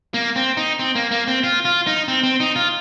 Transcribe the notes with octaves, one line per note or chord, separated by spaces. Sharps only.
A#3
C4
D#4
C4
A#3
A#3
C4
F4
F4
D#4
C4
C4
D#4
F4